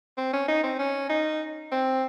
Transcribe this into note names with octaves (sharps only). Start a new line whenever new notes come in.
C4
C#4
D#4
C4
C#4
D#4
C4